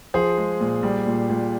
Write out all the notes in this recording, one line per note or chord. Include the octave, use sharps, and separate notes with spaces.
F3 G#4 C5
G#3
A#2
G3
A#2
A#2